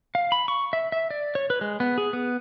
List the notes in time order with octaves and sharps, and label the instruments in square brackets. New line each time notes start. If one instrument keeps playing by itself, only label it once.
[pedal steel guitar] F5
B5
C#6
E5
E5
D5
C#5
B4
G#3
B3
G#4
B3